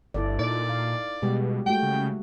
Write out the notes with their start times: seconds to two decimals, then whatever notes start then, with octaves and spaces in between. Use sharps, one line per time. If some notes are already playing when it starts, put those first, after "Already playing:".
0.14 G1 E4 A4 D5
0.39 A#2 D#4 D5
0.69 F5
1.22 B2 G3 G#3 G4
1.66 G#3 A3 F#4 G5
1.83 C#3